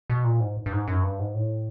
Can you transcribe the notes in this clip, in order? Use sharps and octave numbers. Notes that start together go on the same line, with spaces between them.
B2
A#2
G#2
G2
G#2
F#2
G2
G#2
A2